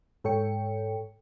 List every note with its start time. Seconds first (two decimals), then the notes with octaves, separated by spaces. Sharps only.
0.24 G#2 A4 C#5 G5 C#7